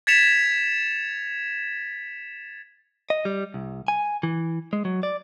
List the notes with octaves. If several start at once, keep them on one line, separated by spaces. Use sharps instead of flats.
G#6 A6 B6 C#7 E7 F7
D#5
G3
C2
G#5
E3
G#3
F#3
D5